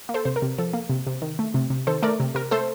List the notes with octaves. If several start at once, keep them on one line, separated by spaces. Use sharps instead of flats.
A#3
A4 C5
C3 C5
A#4
C3
F3 A4
A#3
C3
C3
D#3
A3
C3
C3
D#3 A4 C5
A3 A#4 D5
C3
C3 A#4
A3 A4 C5